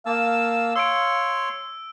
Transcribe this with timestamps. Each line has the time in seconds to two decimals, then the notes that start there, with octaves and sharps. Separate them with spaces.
0.06 A#3 F5 A5 E6
0.76 C#5 C6 E6 D7